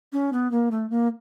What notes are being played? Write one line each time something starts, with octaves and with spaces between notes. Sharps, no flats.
C#4
B3
A#3
A3
A#3